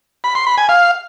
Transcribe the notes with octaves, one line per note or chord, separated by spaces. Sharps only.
B5
C6
B5
G#5
F5